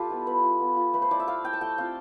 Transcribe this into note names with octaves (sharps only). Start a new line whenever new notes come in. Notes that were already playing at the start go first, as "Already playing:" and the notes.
Already playing: G3 F4 G4 A4 B4
B3 E4
B3 B4
F4
B3
F4
A3 B4
C5
E4 D5
E5
A3 F5
E4 G5
A5
A3 G5
C4 F4 F5